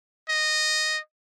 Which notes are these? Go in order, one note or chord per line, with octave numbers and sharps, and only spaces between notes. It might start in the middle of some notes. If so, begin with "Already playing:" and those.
D#5